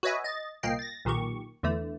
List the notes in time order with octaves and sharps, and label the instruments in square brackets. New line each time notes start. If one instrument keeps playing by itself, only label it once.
[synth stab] F#4 B4 C#5 D#5 E5 G#5
D#5 A6
C2 A#2 A#3 D#5 G5 C7
A6 A#6
B1 A#2 D#3 G4 C#6
E2 D3 E3 A3